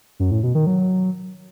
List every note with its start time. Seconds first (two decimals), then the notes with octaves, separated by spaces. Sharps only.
0.20 F#2
0.31 A2
0.43 B2
0.55 D#3
0.67 F#3